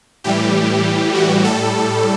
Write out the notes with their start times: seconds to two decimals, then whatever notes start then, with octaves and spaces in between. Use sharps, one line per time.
0.24 A2 E3 G3 G4
1.15 F#4
1.44 A2 G3 A4